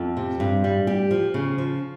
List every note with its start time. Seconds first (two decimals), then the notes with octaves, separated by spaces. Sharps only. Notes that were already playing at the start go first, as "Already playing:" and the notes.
Already playing: F2
0.17 C3
0.40 G2
0.64 G3
0.87 G4
1.11 F3
1.34 C#3
1.58 F3